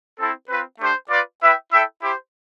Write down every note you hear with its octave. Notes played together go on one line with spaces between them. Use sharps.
C4 E4 A4
C4 F4 B4
A3 D4 G4 C5
F4 B4 D5
E4 B4 E5 G5
E4 A4 E5 G5
E4 G4 C5